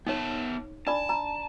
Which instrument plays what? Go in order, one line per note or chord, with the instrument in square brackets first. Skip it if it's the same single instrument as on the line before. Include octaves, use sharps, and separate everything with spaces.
[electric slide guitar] B3 E5 A5 [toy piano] D#4 C#5
[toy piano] D4 D5 B5 [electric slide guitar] A5
[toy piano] A#5